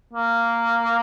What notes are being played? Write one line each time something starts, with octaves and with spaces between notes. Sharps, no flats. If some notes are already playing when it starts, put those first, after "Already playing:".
A#3